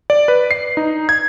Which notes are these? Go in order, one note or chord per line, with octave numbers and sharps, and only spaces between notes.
D5
B4
C7
D#4
G#6